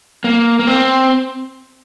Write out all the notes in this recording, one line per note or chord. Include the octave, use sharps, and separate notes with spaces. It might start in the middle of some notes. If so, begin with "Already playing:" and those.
A#3
A#3
C4